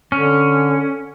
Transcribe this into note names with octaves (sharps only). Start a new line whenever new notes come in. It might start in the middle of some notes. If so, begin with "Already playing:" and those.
D3 C#4